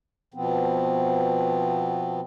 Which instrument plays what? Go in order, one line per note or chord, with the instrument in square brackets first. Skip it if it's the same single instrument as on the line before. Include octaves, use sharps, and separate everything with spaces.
[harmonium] B2 F3 B3 C4